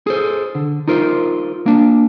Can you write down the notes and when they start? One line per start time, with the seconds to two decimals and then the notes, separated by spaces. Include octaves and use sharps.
0.07 G#4 A4 C5
0.55 D3
0.88 D#4 F4 A#4 C5
1.66 A#3 D4